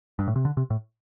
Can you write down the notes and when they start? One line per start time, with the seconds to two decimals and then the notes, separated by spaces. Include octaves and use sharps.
0.19 G2
0.28 A2
0.36 C3
0.45 D3
0.57 C3
0.70 A2